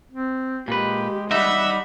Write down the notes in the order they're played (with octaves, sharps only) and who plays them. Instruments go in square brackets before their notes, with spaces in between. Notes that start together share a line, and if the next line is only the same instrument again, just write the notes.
[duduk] C4
[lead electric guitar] A#2 B4 [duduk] G#3 [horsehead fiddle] G4
[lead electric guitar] G3 D#4 [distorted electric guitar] E5 [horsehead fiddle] F#5 B5